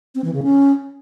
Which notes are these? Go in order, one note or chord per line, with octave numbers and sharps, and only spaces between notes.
C4
E3
C#3
C#4